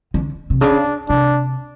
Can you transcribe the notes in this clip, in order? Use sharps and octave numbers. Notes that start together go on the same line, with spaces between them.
D3
C3
C#3 D4
C3 D4